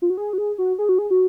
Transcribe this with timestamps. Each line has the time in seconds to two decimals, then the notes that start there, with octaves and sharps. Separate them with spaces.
0.02 F4
0.10 F#4
0.17 G#4
0.33 F#4
0.38 G#4
0.58 F#4
0.79 G#4
0.89 F#4
0.98 G#4
1.11 F#4